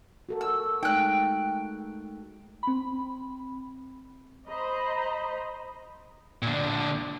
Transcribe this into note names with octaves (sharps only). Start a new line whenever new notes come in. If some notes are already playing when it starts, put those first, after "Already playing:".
F#4 A4 A#4
E6
G#3 A3 D#4 G5 F#6
C4 B5
C5 D#5 A#5 B5
A#2 D3